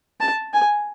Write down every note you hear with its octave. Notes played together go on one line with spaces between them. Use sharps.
A5
G#5